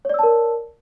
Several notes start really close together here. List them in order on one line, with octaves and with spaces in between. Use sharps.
C#5 D5 E6 A5 A#4